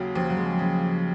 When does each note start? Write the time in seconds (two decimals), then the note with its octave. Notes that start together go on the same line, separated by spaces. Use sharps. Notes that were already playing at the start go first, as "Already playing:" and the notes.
Already playing: D#2 C#3 F#3
0.15 D#2 F3
0.30 F#3
0.37 G#3
0.59 C#3